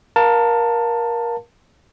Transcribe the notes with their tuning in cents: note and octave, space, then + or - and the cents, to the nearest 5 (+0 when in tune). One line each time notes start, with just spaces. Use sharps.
A#4 +20 F5 +15 A5 +20